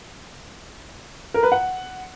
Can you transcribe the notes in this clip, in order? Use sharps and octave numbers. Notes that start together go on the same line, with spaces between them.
A#4
B4
F#5